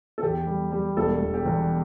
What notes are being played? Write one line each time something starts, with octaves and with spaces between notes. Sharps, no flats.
A4
E2 G4
G3
G3
E1 A4
E1
G4
E2